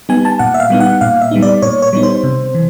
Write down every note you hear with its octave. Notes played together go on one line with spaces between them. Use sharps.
G3 B3 D#4 G#5
A5
A#2 F#5
E5
F5
G3 B3 D#4
F#5
A#2 F5
E5
G3 B3 D#4
D5
A#2 C#5
C#5
G3 B3 D#4
C5
C3
E3